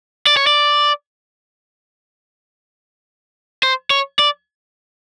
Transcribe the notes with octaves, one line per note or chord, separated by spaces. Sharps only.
D5
C#5
D5
C5
C#5
D5